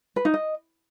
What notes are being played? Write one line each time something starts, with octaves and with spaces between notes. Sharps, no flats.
B4
D#4
D#5